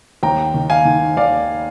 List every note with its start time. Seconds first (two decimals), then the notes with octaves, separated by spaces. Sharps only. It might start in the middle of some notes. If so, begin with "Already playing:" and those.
0.23 D#2 G5 A#5
0.54 D#3
0.70 F5 G#5
0.85 D#3
1.17 D#2 D5 F5